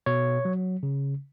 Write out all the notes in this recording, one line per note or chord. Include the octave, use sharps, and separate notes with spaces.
B2 C#5
F#3
C#3